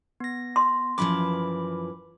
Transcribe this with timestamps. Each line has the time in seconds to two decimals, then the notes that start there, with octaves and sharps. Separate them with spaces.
0.20 B3 A#6
0.56 C6
0.98 F#2 E3 F3 B5 D6